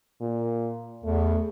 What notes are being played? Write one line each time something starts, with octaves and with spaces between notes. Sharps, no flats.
A#2
E2 A3